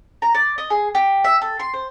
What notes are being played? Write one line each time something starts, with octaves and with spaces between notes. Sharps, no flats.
A#5
D5
D#5
G#4
G4
E5
A4
C6
C5